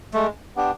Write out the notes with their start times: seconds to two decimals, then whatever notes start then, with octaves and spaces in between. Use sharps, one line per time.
0.14 G#3 A3
0.56 B3 D4 G4